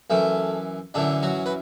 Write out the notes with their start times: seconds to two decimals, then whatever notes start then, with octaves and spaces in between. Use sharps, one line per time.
0.10 F#2 E3 A3
0.94 F#2 D3 E3 D4
1.23 F#3 F#4
1.46 B4